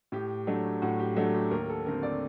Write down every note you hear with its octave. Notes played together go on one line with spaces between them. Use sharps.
A2 G4
F#3 A3 D4
A2 F#4
G4
F#3 A3 D4 F#4
G4
D#2 A#4
A4
D3 A3 C4 A#4
D5